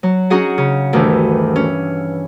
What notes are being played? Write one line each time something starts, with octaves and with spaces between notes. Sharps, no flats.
F#3
C#4 D#4 F#4 G#4 F#5
C#3
D2 G2 D#3 E3
C#4